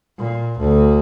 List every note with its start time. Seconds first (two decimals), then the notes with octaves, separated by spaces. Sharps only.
0.18 A#2
0.59 D2